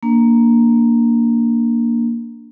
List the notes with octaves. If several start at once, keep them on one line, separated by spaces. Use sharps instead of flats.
A#3 D4